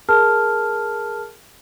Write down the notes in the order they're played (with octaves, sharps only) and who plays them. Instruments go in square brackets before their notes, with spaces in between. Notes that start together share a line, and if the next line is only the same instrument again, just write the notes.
[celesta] G#4 A#4 A5 F6